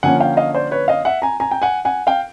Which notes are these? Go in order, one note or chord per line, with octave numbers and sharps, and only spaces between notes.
D3 F3 A#3 C#4 F#5 G#5
F5 G5
D#5 F5
C5 D5
B4 C#5
D#5 F5
E5 F#5
G#5 A#5
G#5 A#5
G5
F#5 G#5
F#5 G#5
F5 G5